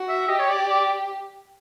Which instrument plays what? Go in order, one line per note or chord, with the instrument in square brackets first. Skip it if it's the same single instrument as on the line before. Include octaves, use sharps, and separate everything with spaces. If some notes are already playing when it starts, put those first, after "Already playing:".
Already playing: [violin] F#4
[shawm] E5
[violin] G4 [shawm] D#5
[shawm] C#5
D5
D5